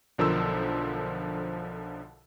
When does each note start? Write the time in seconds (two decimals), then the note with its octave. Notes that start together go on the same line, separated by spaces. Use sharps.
0.18 B1 D3 F3 A#4 C5 E6